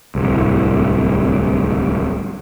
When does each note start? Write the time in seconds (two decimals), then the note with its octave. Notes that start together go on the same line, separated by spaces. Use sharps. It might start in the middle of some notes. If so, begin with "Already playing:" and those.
0.15 D1 C2